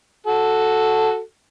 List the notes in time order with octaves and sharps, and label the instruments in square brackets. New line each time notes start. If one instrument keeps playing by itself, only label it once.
[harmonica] F#4 A4